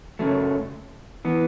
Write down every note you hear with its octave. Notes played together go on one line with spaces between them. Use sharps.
F#2 C#3 F#3 A3
E3 B3